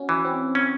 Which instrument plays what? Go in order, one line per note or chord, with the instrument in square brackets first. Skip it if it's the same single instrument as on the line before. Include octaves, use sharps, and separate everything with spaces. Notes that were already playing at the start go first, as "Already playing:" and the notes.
Already playing: [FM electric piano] C#4 F#4
[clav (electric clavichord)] E3
[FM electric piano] C4
[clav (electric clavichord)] C#4